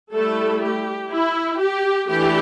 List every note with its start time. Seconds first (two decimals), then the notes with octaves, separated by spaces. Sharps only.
0.14 G3 A3 E4 A4
0.63 G4
1.12 E4
1.60 G4
2.10 E3 A3 D4 G4